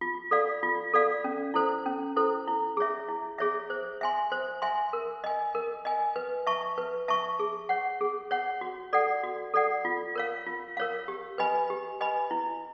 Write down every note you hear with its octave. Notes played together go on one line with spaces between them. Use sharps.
F4
A4 D5 F5
F4
A4 D5 F5
C#4
E4 A4 C5
C#4
E4 A4 C5
E4
G#4 C#5 E5
E4
G#4 C#5 E5
C5
E5 G#5 C6
C5
E5 G#5 C6
A#4
D#5 G#5
A#4
D#5 G#5
B4
E5 A5 C#6
B4
E5 A5 C#6
G#4
C#5 F#5
G#4
C#5 F#5
F#4
A4 D5 F#5
F#4
A4 D5 F#5
F4
A#4 C#5 F5
F4
A#4 C#5 F5
G4
B4 D#5 G#5 B5
G4
B4 D#5 G#5 B5
E4